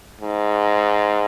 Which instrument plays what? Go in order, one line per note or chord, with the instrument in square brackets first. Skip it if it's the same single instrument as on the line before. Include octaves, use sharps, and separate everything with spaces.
[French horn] G#2